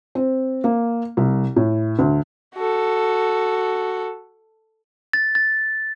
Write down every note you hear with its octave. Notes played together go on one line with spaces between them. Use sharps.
C4
A#3
C2
A2
D2
F#4 A4
A6
A6